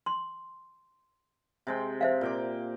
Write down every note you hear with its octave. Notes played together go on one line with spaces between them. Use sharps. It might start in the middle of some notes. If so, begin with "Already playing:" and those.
C6
C3 G#3 G5
C5 E5 F5
A#2 G5 D6